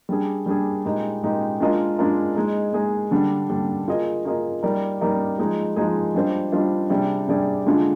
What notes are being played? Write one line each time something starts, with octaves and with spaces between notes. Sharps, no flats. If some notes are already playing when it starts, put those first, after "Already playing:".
G3 D4 G#4
G3 D4 G#4
A#2 G#3 D#4 G4
A#2 G#3 D#4 G4
G#3 D4 F4 A#4 D#5
G#3 D4 F4 A#4 D#5
G#3 D#4 G#4 D#5
G#3 D#4 G#4 D#5
D3 G3 D4
D3 G3 D4
A#3 F4 G#4 D#5
A#3 F4 G#4 D#5
G3 A#3 D#4 A#4 D5
G3 A#3 D#4 A#4 D5
F3 G#3 D#4 G#4
F3 G#3 D#4 G#4
G3 D4 F4 C5 D#5
G3 D4 F4 C5 D#5
C3 G3 D4 G#4 D5
C3 G3 D4 G#4 D5
D3 G#3 D4 F4 G#4